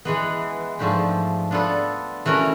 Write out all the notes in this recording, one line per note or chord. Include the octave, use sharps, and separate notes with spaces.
E3 G#3 B3
G#2 F3 A3 D4 G4
G3 B3 D4 F4 A4
E3 A3 C#4 F#4 A#4